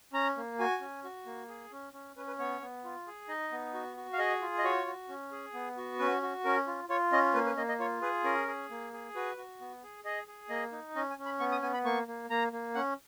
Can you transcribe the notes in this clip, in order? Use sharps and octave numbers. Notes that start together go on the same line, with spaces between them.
C#4 A#5
A#3
F#4 G#5
C#4
F#4
A#3
G#4
C#4
C#4
C#4 B4
B4
B3 C#5
B3
F4
G#4
D#4 D#5
B3
F#4
F#4
F5
G#4 D#5
F4
D#5
F#4 C#5
F#4
C#4
G#4
B3
F#4
C#4 B4
F#4
C#4 A#4
F4
F4 C#5
C#4 D#5
A#3 B4
B4
A#3 D#5
D#5
F4 C#5
G#4 B4
C#4 A#4
G#4
A#3
G#4
F#4 B4
F#4
B3
G#4
G#4 D#5
G#4
A#3 D#5
D#4
C#4 D#5
G#5
C#4
B5
B3 C#6
D#6
B3 G#5
B5
A#3 C#6
A#3
A#3 A#5
A#3
C#4 F#5